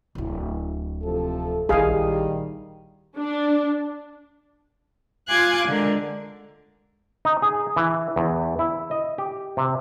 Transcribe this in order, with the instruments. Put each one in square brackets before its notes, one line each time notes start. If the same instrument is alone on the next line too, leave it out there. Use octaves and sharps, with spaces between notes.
[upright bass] D1 E4
[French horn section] C3 F3 A4
[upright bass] A#1 E4 [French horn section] D#3 G3 [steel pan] G#4 F5
[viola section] D4
[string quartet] F4 G#5 C6 D6 F#6 G#6
D3 G#3 A#4
[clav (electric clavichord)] D#4
G#4
E3
E2
E4
D#5
G4
C3